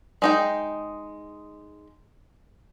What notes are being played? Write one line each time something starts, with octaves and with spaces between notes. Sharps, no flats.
G#3 D#4 G5